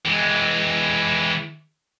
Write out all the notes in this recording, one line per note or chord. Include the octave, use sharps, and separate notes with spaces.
E3 G#3